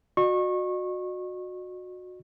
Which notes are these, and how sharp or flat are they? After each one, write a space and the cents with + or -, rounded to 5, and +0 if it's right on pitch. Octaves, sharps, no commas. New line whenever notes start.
F#4 -20 D#5 -45 C#6 -25